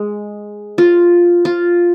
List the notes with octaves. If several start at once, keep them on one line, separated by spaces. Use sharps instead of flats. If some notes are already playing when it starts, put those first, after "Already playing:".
Already playing: G#3
F4
F4